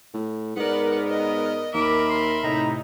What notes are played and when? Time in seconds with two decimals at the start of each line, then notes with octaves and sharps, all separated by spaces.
0.14 A2
0.56 G#2 B3 A#4 D5 F#5
1.08 D#5
1.74 D#2 A#4 E5 B5 D6
2.09 C6
2.43 A2 C3 D#4 A#5